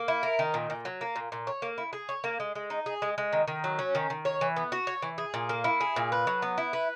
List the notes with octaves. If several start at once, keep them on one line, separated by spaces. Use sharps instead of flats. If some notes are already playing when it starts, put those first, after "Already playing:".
Already playing: A#3
E4
A#4
D#3
A#2
A#2
F#3
A#3
A#2
A#2
C#5
A#3
E4
G#4
C#5
A#3
G#3
G#3
D#4
G#4
G#3
G#3
D#3
D#3
F#3
C#4
D#3
D#3
C#5
E3
B3
F#4
C#5
E3
G#4
A#2
A#3
E4
G#4
A#2
B4
F#3
B3
E4
B4